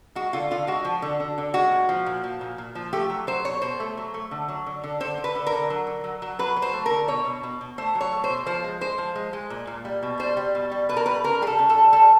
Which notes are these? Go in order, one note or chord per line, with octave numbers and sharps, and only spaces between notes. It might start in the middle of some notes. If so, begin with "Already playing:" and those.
G#3 F#4
D3 F4
D3 F4
G#3 F#4
F3
D3
D3
D3
G#3 F#4
A#2
F3
A#2
F3
A#2
A#2
F3
A3 G4
F#3
F#3 C5
B2 C#5
B2 C5
A3
F#3
A3
D3
F#3
D3
D3
D3 C5
D3
B4
D3
A#4
D3
F#3
D3
F#3
F#3
F#3 B4
F#3
C5
A3
D3 A#4
B2 C#5
B2
B2
B2
A3 C5
F#3
C#5
A3
C5
B2
F3 C5
G#3
G#3 C5
F3
G#3
G#3
A#2
A#2
G3
B2
G3 C5
G3
B2
G3
B2 B4
A#4
G3 B4
C#3 A#4
G3 G#4
A4
C#3
A4
G3
G3 A4